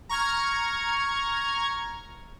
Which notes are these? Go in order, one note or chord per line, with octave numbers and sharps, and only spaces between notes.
A#5 C#6 F6 G#6